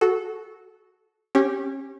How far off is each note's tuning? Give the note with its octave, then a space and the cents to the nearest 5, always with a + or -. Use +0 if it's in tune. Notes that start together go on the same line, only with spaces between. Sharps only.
F#4 +0 A4 -20
C#4 -25 G4 +0